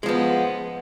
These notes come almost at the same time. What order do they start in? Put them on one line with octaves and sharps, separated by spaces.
G#3 F3 B3